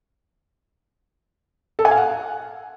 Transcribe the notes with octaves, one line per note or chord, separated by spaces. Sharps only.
A4
G#5
F5
F#5